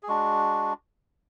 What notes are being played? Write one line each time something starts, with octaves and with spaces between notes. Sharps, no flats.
G#4
G#3 D4 F#4